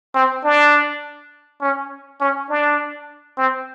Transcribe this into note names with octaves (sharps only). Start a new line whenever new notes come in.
C4
D4
C#4
C#4
D4
C4